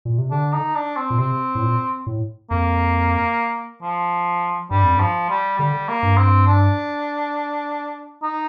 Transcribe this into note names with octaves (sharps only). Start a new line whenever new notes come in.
A#2
C3
D3 D4
D#4
D4
C4
A#2
C3 C4
A2
A#2
A2
F2 A#3
F3
G2 G3
F2
G2
F3
G3
D3 G3
A#3
G2
C4
D4
D#4